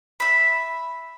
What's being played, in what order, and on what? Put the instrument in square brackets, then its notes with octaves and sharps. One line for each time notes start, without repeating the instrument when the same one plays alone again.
[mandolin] E5 B5